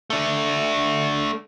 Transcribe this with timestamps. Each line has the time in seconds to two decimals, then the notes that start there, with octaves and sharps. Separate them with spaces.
0.10 A3 D4